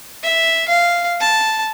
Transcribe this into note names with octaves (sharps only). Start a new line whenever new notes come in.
E5
F5
A5